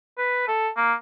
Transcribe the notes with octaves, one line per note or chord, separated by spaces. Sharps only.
B4
A4
A#3